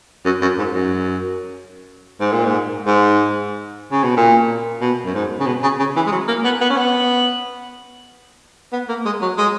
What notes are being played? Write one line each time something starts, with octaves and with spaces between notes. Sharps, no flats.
F#2
F#2
G#2
F#2
G#2
A#2
G#2
G#2
C#3
B2
A#2
B2
F#2
G#2
C#3
B2
C#3
C#3
E3
G#3
F#3
A#3
B3
B3
C#4
B3
B3
A#3
G#3
F#3
G#3